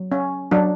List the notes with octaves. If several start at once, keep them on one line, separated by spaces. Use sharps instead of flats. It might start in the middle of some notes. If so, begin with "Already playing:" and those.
Already playing: F#3
C#4
F#3 D4